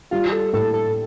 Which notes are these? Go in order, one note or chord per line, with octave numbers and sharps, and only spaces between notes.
G3 F4
G4
A4
A2 A4
A4